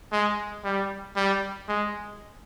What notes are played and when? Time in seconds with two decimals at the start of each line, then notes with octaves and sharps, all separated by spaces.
0.12 G#3
0.64 G3
1.16 G3
1.69 G#3